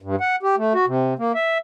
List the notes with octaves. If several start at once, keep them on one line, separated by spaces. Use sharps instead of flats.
G2
F#5
G4
A3
F#4
C3
A#3
E5